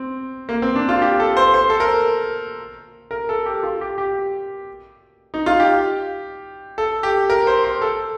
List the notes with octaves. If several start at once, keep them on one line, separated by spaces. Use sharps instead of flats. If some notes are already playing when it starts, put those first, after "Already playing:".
Already playing: C4
A#3
C4
D4
F4
G4
A4
C5
C5
A4
A#4
A#4
A4
G4
F4
G4
G4
D#4
F4
G4
A4
G4
A#4
C5
C5
A4